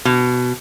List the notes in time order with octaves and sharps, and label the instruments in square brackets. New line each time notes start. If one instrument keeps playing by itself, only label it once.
[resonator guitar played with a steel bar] B2